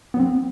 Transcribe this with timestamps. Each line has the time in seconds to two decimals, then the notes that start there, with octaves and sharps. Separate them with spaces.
0.14 B3
0.17 F#3
0.20 C4